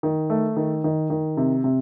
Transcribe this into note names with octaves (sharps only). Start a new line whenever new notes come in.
D#3
A3
D#3
D#3
D#3
C3
C3